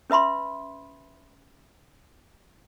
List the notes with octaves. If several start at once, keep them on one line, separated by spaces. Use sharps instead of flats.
C#4 B4 E5 B5 C6